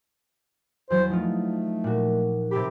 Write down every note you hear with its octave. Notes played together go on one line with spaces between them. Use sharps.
E2 F#3 C5
F3 A3 D#4 F4
A#2 F#4
C3 C4 G4 B5